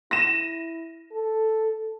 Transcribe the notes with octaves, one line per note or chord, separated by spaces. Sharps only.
E4 A#6 D#7 E7
A4